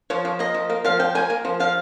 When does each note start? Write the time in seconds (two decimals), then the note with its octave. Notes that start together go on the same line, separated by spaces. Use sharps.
0.10 F3 C#5
0.25 F3
0.39 A#3 D#5
0.54 F3
0.70 A#3
0.84 F3 F5
0.99 F3 G5
1.15 A#3 G#5
1.30 A#3
1.45 F3
1.60 F3 F5